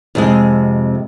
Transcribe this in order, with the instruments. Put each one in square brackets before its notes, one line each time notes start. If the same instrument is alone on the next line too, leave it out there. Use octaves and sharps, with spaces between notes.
[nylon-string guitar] F2 C3 G#3